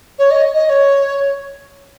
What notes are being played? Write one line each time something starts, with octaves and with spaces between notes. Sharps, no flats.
C#5
D#5
D#5
D#5
C#5